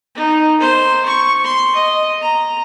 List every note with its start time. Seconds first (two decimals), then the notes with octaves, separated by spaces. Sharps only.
0.15 D#4
0.60 C5
1.05 C#6
1.44 C6
1.75 D#5
2.21 A#5